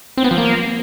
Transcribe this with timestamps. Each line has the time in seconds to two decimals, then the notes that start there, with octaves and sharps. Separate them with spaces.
0.17 C4
0.24 B3
0.31 F3
0.38 A#3